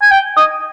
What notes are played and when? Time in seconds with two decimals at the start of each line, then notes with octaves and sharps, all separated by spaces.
0.02 G#5
0.11 G5
0.37 D#5